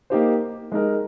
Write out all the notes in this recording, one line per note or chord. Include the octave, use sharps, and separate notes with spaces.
A#3 D#4 G4 C5
G#3 D#4 A#4 D#5